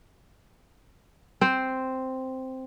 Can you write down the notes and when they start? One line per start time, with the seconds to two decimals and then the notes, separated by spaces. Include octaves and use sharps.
1.41 C4 C5